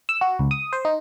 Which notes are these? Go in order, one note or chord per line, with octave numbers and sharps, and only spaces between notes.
E6
F#4
C#2
D#6
C5
D#4